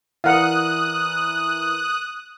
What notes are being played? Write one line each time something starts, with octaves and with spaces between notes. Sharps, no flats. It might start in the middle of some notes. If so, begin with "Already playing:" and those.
E3 A#4 D5 F5 F#5 D#6 F#6